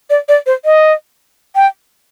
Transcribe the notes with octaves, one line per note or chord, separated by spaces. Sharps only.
D5
D5
C5
D#5
G5